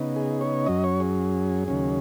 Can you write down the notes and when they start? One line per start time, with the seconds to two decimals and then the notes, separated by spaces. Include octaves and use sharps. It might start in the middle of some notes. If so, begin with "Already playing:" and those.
Already playing: C#3 B3 D#4
0.16 G#4
0.41 C#5
0.66 F#2 F#3 C#4 D#5
0.84 C#5
1.00 G#4
1.68 D#2 C#3 F#3 C#4